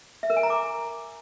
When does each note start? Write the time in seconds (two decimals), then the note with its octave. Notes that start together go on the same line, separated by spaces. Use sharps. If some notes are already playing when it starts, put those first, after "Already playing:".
0.23 E5
0.30 A#4
0.37 G#5
0.43 A#5
0.50 D6